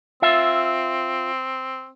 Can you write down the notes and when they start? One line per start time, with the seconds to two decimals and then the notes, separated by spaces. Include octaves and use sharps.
0.22 C4 F4 E5